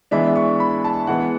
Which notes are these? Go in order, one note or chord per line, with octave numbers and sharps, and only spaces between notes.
E3 G#3 B3 D4 E5
C#6
B5
A5
E3 G#3 B3 F#5